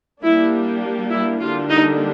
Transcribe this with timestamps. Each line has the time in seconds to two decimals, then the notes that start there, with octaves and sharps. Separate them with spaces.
0.22 G3 A#3 D4 E4
1.11 E4
1.40 D3 G3 A#3 D4 F4
1.69 D#4